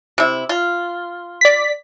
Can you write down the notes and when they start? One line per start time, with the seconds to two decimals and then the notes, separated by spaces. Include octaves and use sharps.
0.18 C3 E4
0.49 F4
1.41 D5 B6